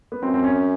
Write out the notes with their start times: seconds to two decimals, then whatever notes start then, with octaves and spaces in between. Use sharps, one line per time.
0.12 B3
0.23 F#2 C4
0.34 C4
0.44 C#4